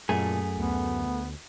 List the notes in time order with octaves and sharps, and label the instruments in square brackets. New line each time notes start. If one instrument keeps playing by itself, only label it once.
[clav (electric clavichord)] F#2 A5 [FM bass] A#2 [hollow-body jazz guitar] A3 G#4
[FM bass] D2 [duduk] B3